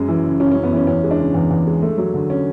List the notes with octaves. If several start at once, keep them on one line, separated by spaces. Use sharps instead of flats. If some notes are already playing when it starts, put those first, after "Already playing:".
Already playing: F#2 G#3
E3
C#3
F#2 C#4
F#2 C#4
B3
E3 C#4
E2 C#4
G#3
D4
C#3
E2
E2
G#3
A3
F#3
D3
C#4